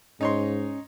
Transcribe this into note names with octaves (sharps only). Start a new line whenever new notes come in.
G#2 C#4 D#4 C#5 C6